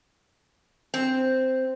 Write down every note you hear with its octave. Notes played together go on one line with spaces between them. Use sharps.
C4